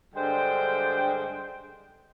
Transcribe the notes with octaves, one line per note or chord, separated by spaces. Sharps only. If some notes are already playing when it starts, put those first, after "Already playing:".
G2 D3 G#3 C5 G5